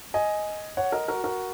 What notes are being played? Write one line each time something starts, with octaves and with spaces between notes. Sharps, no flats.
D#5 G#5
C#5 F#5
A#4 D#5
F#4 A#4
F#4 A#4